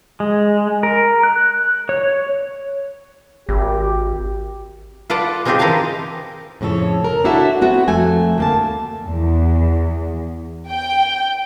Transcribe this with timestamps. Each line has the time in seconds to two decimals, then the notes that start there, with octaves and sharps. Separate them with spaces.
0.20 G#3
0.83 A#4
1.23 F#6
1.89 C#5
3.49 G#1 G4
5.10 F4 A4 B4 D5 F5 F#5
5.45 G#3 C4 D#4 F4 G4 G#4
5.59 E3 D#4 E4 A#4 F5 A5
6.61 F2 A2 C#3 A4 C#5
7.04 A#4
7.24 D4 E4 F#4 A4 E5
7.61 B3 C4 F#4
7.88 F2 A3 G#5
8.38 D2 A#3 A5
9.05 E2
10.69 G5